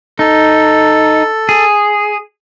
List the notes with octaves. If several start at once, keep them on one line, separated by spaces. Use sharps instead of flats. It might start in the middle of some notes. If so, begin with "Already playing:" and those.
D#4 A4
G#4